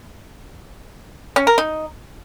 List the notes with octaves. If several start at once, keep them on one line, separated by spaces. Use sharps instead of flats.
C#4
A#4
D#4